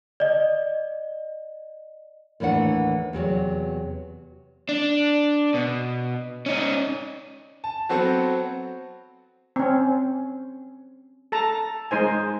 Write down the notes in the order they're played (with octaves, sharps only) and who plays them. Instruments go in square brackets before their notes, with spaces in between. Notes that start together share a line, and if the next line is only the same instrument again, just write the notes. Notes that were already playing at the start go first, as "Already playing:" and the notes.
[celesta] D5 D#5
[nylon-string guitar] D#2 A2 E3 D4 F#5
E2 C3 F3 F#3
[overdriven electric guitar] D4
B2
C#4 D#4
[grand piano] A5
F#3 B3 C4 F#4 A4 C5
[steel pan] C4 C#4
A4 A5 A#5
G#3 D#4 C5 G#5